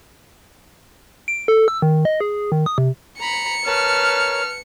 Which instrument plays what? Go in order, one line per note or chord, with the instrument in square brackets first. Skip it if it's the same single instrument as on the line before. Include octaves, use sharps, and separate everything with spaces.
[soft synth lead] D7
A4
E6
D#3
D#5
G#4
D#3
D#6
C3
[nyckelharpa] A#5 B5 [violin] C#7
[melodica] A#4 C#5 [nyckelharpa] B4 A5 [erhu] F6